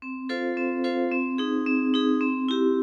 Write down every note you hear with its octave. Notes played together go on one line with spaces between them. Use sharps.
C4
F4 A4 C5 F5
C4
F4 A4 C5 F5
C4
D#4 G#4
C4
D#4 G#4
C4
E4 G4